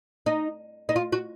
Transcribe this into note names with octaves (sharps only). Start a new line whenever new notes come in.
D#4
D#4
F4
F#4